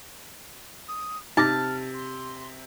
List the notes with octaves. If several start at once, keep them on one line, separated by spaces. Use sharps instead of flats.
D#6
C3 D#4 A5 D6 F6 A#6
C6